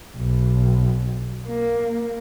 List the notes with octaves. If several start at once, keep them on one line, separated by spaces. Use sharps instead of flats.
B1
A#3